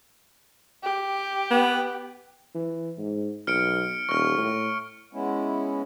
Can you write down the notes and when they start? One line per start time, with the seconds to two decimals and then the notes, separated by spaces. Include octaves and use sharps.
0.83 G4
1.51 B3
2.55 E3
2.98 G#2
3.47 B1 F6 C#7 D7
4.09 D#1 C#6 F6
4.38 A2
5.13 G#3 B3 C#4 E4